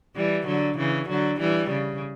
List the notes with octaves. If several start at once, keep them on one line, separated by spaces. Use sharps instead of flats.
E3 G3
D3 F#3
C#3 E3
D3 F#3
E3 G3
C#3